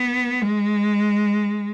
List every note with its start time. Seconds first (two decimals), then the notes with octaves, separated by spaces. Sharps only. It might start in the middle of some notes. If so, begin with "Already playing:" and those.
Already playing: B3
0.41 G#3